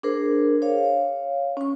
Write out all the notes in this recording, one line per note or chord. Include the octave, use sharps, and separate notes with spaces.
D4 G#4 A#4 C5
C#5 F5
C#4 C#6